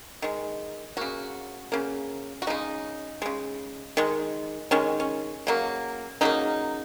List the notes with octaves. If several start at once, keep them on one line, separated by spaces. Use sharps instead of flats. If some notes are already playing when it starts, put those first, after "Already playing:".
D#3 G#3
C#3 A#3 F#4
C#3 A#3
F#4
C#3 G#3 D#4
C#3 G#3
D#3 G#3
D#3 G#3 C#4
C#4
C#3 F#3 A#3
C#3 F#3 A#3 D#4